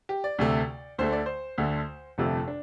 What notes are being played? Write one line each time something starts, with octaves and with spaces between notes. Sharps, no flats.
G4
D5
D2 C3 A3
D2 D3 A3 C5
D5
C5
D2 D3 A3
G1 F2 C3 A3 A4
D4